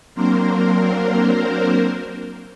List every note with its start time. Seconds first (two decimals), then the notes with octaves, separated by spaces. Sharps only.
0.14 F#3 A#3 C4 D4 A#4 C5